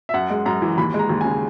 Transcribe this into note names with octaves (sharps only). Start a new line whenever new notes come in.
E5
F#2 F#5
G#3
F#2 A#5
E3
D#2 B5
G#3
A#5
D#2
C#3 G#5